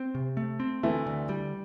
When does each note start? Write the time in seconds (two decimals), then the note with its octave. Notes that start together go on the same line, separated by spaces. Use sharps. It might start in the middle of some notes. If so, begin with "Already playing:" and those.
Already playing: C4
0.15 C3
0.37 A3
0.60 C4
0.83 D2 E3 A3
1.06 D3
1.29 G3